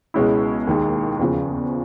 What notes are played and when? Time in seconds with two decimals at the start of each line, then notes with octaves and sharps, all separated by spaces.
0.14 C#2 B2 G#3 C#4 E4
0.67 D#2 D#3 G#3
1.19 E2 C#3 F3